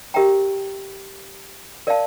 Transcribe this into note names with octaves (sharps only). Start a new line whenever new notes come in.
G4 A#4 E5 G5 A#5
A#4 D5 F5 A5